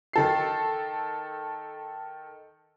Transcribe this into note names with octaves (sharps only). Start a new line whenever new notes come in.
D#3 A4 C7